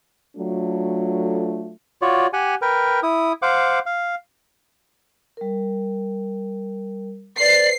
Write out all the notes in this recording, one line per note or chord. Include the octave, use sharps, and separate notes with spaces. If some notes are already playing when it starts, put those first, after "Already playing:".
F#3 A3 D4 F4 A4
F4 F#4 C#5 D5
G4 F#5 G#5
A#4 B4 G5
E4 D#6
C5 F5 F#5 D6
F5
G3 A#4
B4 C5 D5 C7